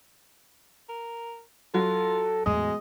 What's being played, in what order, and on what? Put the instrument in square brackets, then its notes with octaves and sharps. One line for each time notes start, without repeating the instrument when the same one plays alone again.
[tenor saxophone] A#4
[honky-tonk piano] F#3 [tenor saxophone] F4 [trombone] A4
[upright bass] E2 A2 [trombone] G#3 [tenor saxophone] D#5